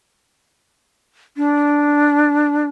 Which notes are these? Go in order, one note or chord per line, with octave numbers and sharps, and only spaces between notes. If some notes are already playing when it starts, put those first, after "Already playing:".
D4